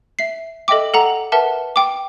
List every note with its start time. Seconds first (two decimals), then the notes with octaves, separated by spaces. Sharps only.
0.19 E5 C7
0.68 A4 D#5 E5 G5 D6
0.94 A4 F#5 A#5
1.32 A#4 B4 E5 F#5 A5
1.76 G5 D6